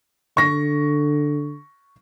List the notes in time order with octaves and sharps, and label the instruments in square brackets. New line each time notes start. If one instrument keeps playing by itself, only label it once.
[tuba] D3 [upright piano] C#6 A#6